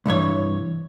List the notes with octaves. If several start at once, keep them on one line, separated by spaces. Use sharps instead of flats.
C2 G2 E3 C#5